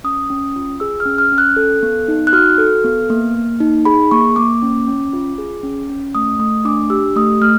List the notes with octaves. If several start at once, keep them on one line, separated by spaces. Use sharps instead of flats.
C#4 D#6
C#4
F4
G#4 E6
F6
C#4
F6
C#4
F#6
A4
B3
D#4
F#6
F#4 F6
A4
B3
A#3
A#3
D#4
G#4 B5
A#3 C#6
A#3 D6
C#4
C#4
F4
G#4
C#4
C#4
A3 D#6
A3 D#6
D4 D6
G4 E6
A3 D#6
A3 F6